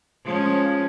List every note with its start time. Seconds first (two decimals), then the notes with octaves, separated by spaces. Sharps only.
0.23 F3 G#3 C#4